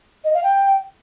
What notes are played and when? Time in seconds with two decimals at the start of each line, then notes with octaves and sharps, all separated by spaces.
0.24 D#5
0.34 F5
0.43 G5